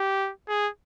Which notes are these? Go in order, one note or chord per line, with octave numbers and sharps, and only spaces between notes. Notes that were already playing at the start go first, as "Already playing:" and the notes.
Already playing: G4
G#4